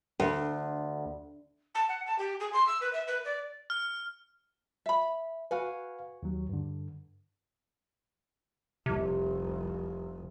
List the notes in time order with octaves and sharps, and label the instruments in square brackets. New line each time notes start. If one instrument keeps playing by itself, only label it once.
[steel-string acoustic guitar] D2
[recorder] A5
F#5
A5
G4
G#4
C6
E6
B4
E5
B4
D5
[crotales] F6
[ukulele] E5 B5
[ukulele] F#4 G#5 [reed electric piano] B4 F5
[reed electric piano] D#2 F#3
G2 D3
[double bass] F1 C2 [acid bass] C3